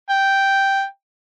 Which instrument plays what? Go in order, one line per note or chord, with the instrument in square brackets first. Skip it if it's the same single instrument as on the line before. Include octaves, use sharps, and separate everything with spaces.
[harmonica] G5